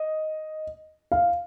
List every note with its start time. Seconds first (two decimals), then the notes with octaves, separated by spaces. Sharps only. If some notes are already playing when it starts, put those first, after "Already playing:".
Already playing: D#5
1.12 F5